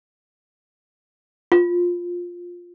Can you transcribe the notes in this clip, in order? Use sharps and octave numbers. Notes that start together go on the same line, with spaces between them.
F4